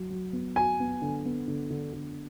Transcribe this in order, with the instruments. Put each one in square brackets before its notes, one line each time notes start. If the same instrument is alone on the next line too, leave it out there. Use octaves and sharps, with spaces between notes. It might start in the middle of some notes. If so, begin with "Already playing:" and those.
Already playing: [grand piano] F#3 F#4
F#3
B3
[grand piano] F#4 [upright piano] G#5
[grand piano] B3
D3
B3
D3
D3
D3